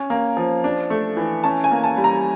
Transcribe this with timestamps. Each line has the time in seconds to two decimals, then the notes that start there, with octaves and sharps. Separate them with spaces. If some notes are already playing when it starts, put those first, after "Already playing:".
Already playing: C#4
0.10 A#3
0.37 F3
0.64 D4
0.90 A3
1.17 E3
1.44 C#4 A5
1.64 G#5
1.71 A#3
1.84 A5
1.97 G3
2.04 A#5